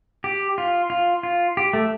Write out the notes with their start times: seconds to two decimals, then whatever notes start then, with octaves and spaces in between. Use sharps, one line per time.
0.24 G4
0.58 F4
0.90 F4
1.23 F4
1.57 G4
1.73 A3